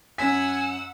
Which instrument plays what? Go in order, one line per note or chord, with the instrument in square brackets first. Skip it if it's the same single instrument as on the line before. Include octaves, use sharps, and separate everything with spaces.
[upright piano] F#2 C#4 B6 [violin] F#5 E6 [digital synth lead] G#5